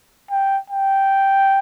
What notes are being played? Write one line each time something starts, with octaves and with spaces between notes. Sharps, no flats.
G5
G5